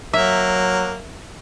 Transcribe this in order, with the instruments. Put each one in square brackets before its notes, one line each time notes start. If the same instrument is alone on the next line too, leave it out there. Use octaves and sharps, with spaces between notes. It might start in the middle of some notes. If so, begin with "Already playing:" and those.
[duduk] F#3 [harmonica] A#3 [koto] E5